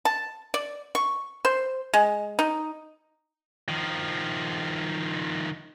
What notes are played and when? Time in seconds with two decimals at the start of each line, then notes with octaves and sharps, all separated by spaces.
0.05 A5
0.54 D5
0.95 C#6
1.45 C5
1.94 G#3
2.39 D#4
3.69 D#3 F3